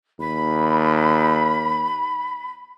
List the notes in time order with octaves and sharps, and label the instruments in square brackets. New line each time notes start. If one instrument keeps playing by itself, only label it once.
[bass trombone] D#2 [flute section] B5